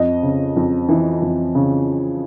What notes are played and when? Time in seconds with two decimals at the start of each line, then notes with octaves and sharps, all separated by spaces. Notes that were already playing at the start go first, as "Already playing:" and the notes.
Already playing: F2 D#5
0.23 C#3
0.56 F2
0.89 E3
1.22 F2
1.55 C#3